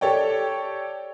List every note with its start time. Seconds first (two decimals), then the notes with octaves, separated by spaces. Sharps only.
0.01 G4 A4 C#5 D5 G5